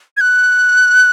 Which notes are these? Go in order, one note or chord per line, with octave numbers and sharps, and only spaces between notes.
G#6
F#6